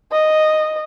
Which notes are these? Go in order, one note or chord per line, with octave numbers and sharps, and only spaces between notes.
D#5